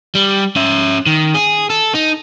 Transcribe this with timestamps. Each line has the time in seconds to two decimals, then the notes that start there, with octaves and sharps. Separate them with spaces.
0.15 G3
0.56 C#4 E5
1.06 D#3
1.34 G#4
1.70 A4
1.94 D#4